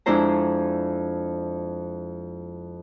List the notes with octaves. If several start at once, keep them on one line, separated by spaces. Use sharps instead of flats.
F2 G#3 D4 E4 C5 A#5